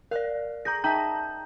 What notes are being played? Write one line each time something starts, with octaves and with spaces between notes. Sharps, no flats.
A#4 D5 F5 F#6
G#4 A#5 G6 A#6
D#4 E5 G5 A5 A#5 G6